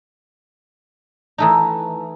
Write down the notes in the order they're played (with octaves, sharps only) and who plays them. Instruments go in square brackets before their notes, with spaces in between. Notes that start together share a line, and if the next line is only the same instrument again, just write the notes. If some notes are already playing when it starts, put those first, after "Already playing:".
[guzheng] E3 A3 D#4